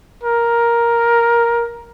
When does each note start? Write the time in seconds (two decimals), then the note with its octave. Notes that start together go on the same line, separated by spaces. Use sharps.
0.23 A#4